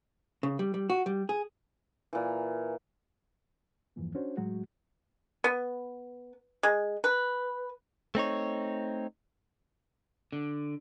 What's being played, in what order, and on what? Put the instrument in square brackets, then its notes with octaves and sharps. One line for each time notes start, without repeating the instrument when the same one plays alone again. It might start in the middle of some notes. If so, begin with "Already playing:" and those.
[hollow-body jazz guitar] C#3
G3
G3
F#4
G3
G#4
[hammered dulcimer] A#2 E3
[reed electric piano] E2 G2 E3 F3 A#3
C#4 D4 F#4 C5 C#5
A2 F#3 G#3 F#4
[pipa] B3
G#3
B4
[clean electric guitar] A3 C4 D#4 C#5
[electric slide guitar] D3